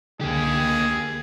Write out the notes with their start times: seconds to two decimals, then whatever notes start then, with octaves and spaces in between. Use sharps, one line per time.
0.21 C#2 D3 A#3 G4 G#4